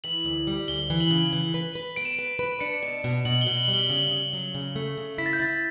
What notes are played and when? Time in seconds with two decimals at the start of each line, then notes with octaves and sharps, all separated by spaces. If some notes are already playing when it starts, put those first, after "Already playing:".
0.04 E3 F#7
0.25 D2
0.47 G3
0.68 D2 G7
0.90 E3
1.00 F#7
1.10 C#3
1.33 E3
1.54 B4
1.75 B4
1.96 B3 D7
2.05 E7
2.14 B4 D7
2.39 B4
2.60 D4 C#7
2.83 B2
3.04 B2
3.25 B2 F#7
3.41 G7
3.47 B2
3.57 F#7
3.68 G3
3.74 G7
3.90 C#3 F#7
4.11 C#3
4.33 F#3
4.55 C#3
4.76 A3
4.98 C#3
5.18 E4 B6
5.26 A6
5.33 G6
5.40 E4 A6